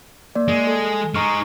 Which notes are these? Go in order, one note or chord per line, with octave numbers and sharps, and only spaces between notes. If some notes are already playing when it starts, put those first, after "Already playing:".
A#3 D5
G#3
A4
G#3 D#4 A#5 C#6 F6